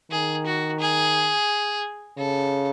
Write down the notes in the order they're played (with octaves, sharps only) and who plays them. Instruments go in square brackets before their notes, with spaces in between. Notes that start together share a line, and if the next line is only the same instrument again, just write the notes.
[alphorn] D#3 [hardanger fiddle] G#4
[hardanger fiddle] F#4
G#4
[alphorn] C#3 [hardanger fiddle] A4